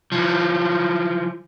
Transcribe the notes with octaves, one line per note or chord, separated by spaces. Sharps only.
E3 F3